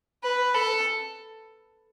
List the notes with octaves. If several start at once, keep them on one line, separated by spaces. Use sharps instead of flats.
B4
A4